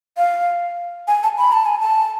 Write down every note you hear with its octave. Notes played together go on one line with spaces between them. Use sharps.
F5
G#5
A5
B5
A5
G#5
A5